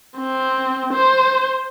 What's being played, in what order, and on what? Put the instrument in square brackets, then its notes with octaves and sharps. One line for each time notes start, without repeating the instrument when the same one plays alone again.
[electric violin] C4
C5